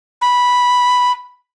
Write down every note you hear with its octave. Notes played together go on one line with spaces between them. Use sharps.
B5